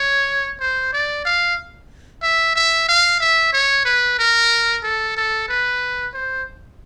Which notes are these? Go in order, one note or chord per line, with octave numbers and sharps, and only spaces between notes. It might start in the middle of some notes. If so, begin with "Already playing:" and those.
Already playing: C#5
C5
D5
F5
E5
E5
F5
E5
C#5
B4
A#4
A4
A4
B4
C5